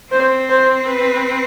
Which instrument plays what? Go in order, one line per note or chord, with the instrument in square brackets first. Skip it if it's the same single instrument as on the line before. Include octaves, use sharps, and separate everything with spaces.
[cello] C4 [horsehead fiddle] C5
[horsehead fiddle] C5
B4